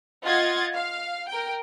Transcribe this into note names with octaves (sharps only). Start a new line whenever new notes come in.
F4 D#5 F#5 G#6 A6
F5
A#4 G5